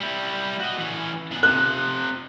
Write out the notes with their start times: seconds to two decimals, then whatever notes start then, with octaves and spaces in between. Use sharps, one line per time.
0.01 G3 E4
0.60 F#4 D#5
0.78 E3 C#4
1.32 G#2 B3
1.43 C3 F3 F#6